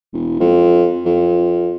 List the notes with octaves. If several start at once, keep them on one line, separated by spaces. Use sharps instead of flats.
E1
F2
F2